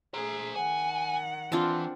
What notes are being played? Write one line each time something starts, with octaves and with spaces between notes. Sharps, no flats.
A3 G#4 C5 A#5
D#3 F#5 G#5
E3 C4 D4 F4